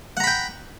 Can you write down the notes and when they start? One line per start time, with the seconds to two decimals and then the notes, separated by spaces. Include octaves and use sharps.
0.17 F#5
0.20 A#5
0.24 B5
0.27 G5